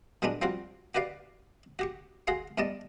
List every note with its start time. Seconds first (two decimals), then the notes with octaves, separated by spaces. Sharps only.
0.22 A#2 F#3 G#3 B3 D4
0.42 F3 G3 C4 F4 F#4
0.95 F#4 G4 B4 D5 F5
1.79 F#4 G4 C#6
2.27 F#4 G#4 F5 C6
2.58 E2 G3 D5 D#5 A5